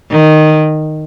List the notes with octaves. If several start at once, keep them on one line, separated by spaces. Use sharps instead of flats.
D#3